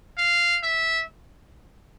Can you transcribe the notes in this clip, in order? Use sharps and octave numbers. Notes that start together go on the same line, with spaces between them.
F5
E5